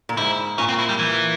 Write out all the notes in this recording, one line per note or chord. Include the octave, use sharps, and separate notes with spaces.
A#2
G#2 E4
A#2 C#4
C4
E4
G3
E3